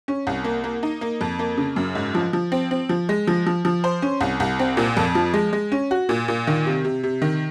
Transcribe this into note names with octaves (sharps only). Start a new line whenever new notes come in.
C#4
C2
A#3
A#3
D#4
A#3
F2
A#3
C#3
F#2
G#2
F3
F3
C4
C4
F3
G#3
F3
F3
F3
C5
C#4
C2
C2
C4
A#2
F2
F3
G#3
G#3
C#4
F#4
A#2
A#2
D#3
C3
C3
C3
D#3